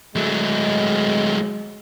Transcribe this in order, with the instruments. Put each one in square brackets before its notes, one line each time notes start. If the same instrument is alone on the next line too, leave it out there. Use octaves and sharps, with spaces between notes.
[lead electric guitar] F#3 A3 [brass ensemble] G#3